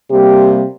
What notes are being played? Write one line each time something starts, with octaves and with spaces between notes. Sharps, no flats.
C3 G3 A#3 G4